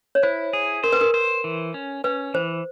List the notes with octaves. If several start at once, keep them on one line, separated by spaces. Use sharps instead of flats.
C#5
E4 C5
G#4
A#4 C5
B4
A#4
C5
E3
C#4
C#4 B4
E3 C5